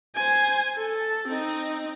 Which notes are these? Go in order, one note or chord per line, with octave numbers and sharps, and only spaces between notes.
C5 G#5
A4
C4 D#4